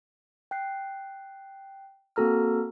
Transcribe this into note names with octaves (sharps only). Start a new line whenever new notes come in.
G5 F#6 C7
A#3 C4 F#4 A4 A#5 F6